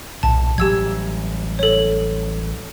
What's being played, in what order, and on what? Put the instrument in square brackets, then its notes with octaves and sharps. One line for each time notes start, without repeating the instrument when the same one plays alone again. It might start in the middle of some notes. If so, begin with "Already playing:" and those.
[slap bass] B1 A#2 [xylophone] A5
[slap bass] A1 F#3 G3 [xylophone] G4 E6 G#6
[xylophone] A4 C#5